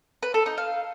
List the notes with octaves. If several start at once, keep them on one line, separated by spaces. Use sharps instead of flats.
B4
A4
D#4
F5